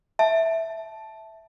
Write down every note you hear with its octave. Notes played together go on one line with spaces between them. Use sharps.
E5 A5